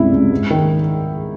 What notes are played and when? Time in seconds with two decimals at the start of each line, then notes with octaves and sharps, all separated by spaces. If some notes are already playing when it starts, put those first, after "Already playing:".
Already playing: C#2 G2 C3 E4
0.12 C#2
0.31 G#2
0.50 D#3